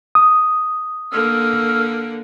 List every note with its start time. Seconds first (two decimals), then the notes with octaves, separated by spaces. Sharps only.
0.15 D#6
1.12 D3 A#3 E6 F6